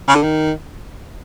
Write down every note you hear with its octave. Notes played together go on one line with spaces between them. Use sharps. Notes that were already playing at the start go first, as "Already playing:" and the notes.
C#3
D3
D#3